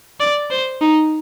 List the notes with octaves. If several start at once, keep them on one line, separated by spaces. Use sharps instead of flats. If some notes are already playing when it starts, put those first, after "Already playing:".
D5
C5
D#4